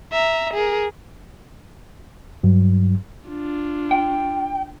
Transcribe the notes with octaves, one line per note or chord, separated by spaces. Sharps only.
E5 A#5
G#4 A#4
G2 F#3
D4 F4
G5